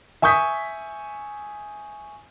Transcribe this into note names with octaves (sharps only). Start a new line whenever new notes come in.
E5 G#5 C#6 D#6 G6 B6